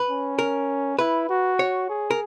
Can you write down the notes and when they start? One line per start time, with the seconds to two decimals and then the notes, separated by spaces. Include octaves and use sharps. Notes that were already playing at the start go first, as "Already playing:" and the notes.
Already playing: B4
0.09 C#4
0.39 A#4
0.99 E4 B4
1.29 F#4
1.59 C#5
1.89 G#4
2.11 A#4